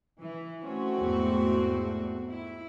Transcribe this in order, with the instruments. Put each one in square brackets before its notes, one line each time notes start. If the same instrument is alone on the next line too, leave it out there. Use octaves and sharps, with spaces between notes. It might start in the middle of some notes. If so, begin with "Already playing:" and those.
[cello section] E3
[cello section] A3 C4 F#4 [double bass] C#4
[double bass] E2 G#2
[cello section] E4